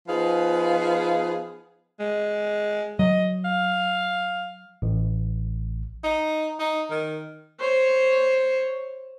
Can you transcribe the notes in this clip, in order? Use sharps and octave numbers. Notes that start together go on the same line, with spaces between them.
F3 B3 D#4 G#4 B4 F5
G#3
F#3 D#5
F5
A1
D#4
D#4
D#3
C5 C#5